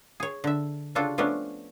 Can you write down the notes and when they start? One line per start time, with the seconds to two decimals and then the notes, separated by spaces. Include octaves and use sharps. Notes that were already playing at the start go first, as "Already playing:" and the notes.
0.20 G#4 C#5
0.44 D3 E5
0.95 C#3 D4 F4 F#4 A4
1.18 F3 A3 B3 C#4 D4